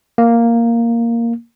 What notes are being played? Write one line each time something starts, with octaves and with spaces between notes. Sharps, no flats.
A#3